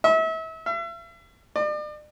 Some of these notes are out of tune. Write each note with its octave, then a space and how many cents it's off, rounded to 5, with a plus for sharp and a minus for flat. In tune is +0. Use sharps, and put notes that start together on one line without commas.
E5 -35
E5 +40
D5 +40